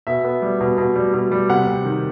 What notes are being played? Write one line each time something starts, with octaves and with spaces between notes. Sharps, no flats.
B2 E5
B3
G3
B2
B2
G3
B2
G3
C3 F#5
C3
D#3